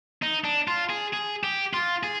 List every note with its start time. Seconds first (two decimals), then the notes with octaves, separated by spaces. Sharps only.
0.22 D#4
0.44 D4
0.68 F4
0.90 G#4
1.13 G#4
1.43 G4
1.73 F4
2.03 G#4